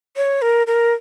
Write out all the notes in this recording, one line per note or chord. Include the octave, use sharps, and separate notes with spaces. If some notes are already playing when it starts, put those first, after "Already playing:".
C#5
A#4
A#4